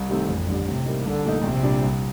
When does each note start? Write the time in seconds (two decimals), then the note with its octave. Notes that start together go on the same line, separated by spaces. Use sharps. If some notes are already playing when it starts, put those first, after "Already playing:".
Already playing: C2
0.09 C3 D#3 A3 C4
0.28 A1 F2
0.48 G2 D3 G3
0.67 A2 C3
0.86 G3 A#3 D#4
1.05 C2 D3
1.24 A#2 A3 D#4
1.43 A#1 C3
1.63 A#2 G3 D4
1.82 C2